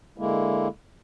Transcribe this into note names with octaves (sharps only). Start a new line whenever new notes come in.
D3 G#3 A#3 E4